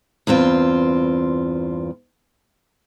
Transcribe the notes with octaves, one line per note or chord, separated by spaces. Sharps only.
E2 G2 C4 F4